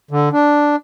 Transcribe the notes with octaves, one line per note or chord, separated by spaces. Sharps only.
D3
D4